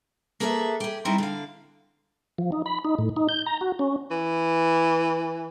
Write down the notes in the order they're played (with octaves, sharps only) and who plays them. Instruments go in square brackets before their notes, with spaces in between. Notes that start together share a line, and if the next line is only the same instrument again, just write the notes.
[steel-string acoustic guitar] A#3 G#4 A4 B4 D#5 E5
G4 G#4
G3 C4 D#4 E4
D3 F5
[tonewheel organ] F3
D#4
B5
D#4
A2
D#4
G6
A#5
F#4
C#4
[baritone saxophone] E3